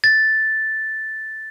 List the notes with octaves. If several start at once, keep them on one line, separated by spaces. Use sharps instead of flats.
A6